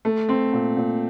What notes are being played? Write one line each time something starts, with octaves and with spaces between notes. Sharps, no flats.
A3
C4
A#2
A#2